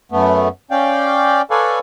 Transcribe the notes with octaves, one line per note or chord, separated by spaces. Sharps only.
F#2 A3 B3
C#4 D5 F5 G5
A4 B4 C#5 D5 F5 G#5